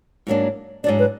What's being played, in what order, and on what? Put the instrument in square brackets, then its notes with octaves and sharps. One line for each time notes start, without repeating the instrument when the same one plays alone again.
[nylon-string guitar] G#2 F#3 A#3 D4
[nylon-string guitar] G#2 F#3 D4 [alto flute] D5
[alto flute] B4